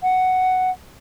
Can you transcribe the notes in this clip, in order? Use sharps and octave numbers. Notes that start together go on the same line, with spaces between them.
F#5